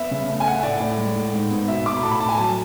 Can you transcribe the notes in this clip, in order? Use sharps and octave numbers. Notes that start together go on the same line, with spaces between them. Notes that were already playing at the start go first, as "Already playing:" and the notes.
Already playing: B3 E5
C#3
A3
G#5
A3 F#5
E5
A2 D5
A2
G#3
A2
G#2
B3
B2 E5
B2 D6
B5
A2 A5
B5
A2 A5
G#5
F#3 A5